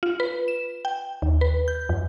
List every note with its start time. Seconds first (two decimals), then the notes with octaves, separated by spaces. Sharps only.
0.03 F4
0.20 B4
0.48 E7
0.85 G5
1.22 D#2
1.41 B4
1.68 G6
1.89 F2